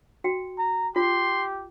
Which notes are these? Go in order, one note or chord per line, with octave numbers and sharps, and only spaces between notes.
F#4 G5
A#5
F4 G4 C6